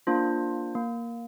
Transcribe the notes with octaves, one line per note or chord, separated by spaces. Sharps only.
A#3 D4 F4 C5
A#3